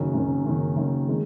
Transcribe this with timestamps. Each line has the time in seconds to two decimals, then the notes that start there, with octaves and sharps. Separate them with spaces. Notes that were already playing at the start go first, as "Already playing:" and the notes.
Already playing: F#1 F#2 D#3
0.13 F#1 F#2 D#3
0.45 F#1 F#2 D#3
0.76 F#1 F#2 D#3
1.08 D#3 G#3